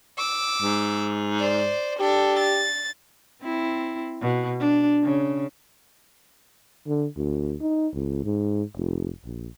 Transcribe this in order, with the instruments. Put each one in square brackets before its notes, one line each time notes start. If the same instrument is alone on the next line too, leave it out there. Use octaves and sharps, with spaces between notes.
[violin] D6 E6
[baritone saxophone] G#2
[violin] C5 D5
[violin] D4 A4 [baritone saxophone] G4
[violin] A6
[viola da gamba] C4 E4
B2
D4
C#3
[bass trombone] D3
D2
D#4
C#2
G#2
F1
A#1